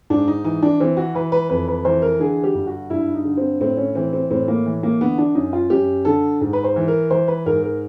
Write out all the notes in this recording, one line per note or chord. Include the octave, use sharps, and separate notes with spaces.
G#2 D4
D#4
E3 D#4
D4
E3 C4
F#4
E3 B4
B4
F2 B4
B4
E3 C5
A#4
D3 G#4
G4
G2
F#4
G2 E4
D#4
D3
C4
A2 C4
C#4
E3 C4
C4
A2 C4
A#3
E3
A#3
D3 B3
D4
F#2 D#4
F4
F#2 G4
D3 A4
G#2
B4
C5
E3
A#4
E3 C5
B4
G#2 A#4
A#4